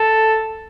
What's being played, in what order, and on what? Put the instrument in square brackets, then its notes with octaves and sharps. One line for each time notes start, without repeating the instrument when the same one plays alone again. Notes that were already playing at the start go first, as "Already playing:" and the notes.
Already playing: [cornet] A4